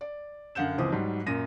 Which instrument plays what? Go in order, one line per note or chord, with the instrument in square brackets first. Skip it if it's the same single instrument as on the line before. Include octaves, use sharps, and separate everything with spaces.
[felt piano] D5
F#2 D3 F5 F#5 G6 E7
C#2 E3 F3 C4 D6 D#6
G#2 F#3 G3
F#2 A#2 A#6 D#7